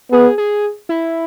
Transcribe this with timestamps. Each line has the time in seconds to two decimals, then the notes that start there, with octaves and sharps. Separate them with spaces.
0.12 B3 G#4
0.38 G#4
0.89 E4